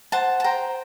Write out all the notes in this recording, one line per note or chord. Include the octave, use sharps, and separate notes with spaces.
C5 F#5 A5
A5
C5 G5 A#5